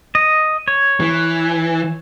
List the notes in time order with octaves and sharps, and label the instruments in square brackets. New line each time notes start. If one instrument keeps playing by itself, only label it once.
[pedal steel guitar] D#5
C#5
[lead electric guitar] E3